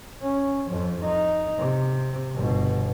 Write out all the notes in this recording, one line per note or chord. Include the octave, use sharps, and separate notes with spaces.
C#4
F2 F3
D#4
C3
G1 B2